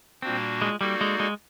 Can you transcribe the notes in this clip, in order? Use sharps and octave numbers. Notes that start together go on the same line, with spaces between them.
A#2 G3 A#3 C4 D4 F#4
G#3
G3 A#3 D#4 F#4 A4 D5
G#3
G#3